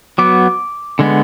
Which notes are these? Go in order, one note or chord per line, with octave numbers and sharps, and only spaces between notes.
F#3 B3 D6
D3 G#3 B3